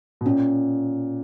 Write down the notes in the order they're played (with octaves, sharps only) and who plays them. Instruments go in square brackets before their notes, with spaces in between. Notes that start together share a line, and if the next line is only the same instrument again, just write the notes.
[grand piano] B2
[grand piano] A#2 [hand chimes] C#4